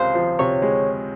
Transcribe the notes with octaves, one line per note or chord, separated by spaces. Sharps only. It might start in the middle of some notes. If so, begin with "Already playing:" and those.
Already playing: C#2 C3 G#3 C5 F5
F3
C3 C#5
G#3